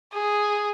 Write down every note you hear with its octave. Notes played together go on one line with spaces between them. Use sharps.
G#4